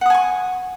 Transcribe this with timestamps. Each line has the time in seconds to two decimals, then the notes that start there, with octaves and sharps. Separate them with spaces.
0.01 F#5
0.06 D#6
0.10 G#5
0.14 C#6